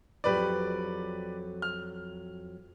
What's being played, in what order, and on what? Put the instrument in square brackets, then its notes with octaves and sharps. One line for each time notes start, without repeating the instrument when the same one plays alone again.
[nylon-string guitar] F2 F#3 [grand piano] G4 B4 D5
[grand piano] F6